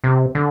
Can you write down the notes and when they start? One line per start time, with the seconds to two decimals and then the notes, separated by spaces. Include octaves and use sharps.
0.04 C3
0.35 D3